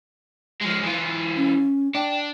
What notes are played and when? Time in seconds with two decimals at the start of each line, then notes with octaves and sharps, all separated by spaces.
0.62 F3 G#3
0.84 E3 F4
1.37 C#4
1.95 D4 G5